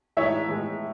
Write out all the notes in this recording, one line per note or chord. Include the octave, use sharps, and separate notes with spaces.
A2 E3 G#3 D#4 C#5 E5
A2 E3 G#3 D#4